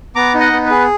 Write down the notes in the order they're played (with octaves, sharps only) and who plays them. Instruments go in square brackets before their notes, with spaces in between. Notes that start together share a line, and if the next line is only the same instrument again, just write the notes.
[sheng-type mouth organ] B3 A#5 D6
D#4
D#5 F#5
B3
G#4 B4